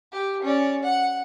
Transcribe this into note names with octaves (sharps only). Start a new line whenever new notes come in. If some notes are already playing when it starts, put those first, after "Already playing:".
G4
C#4 D5
F#5